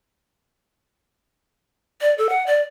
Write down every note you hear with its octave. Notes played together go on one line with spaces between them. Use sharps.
D5
A4
F#5
D5